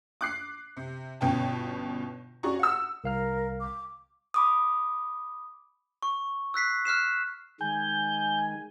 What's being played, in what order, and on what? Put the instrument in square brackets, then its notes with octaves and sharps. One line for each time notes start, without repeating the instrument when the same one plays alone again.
[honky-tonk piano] D6 F#6 C7
C3
G1 B2 C#4 G5 A5
C#4 F#4 G#4 D5 A#5 C#6
F#5 E6
[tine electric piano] C2 F5 F6 [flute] A#4
[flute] D6
[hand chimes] B5 D6 D#6
[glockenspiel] C#6
E6 F#6 B6 C7
F6 F#6 C7 E7
[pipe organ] D#3 G#3 [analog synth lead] G#5 [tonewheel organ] G6